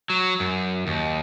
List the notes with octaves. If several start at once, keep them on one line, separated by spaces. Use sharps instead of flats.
F#3
F#2
D#2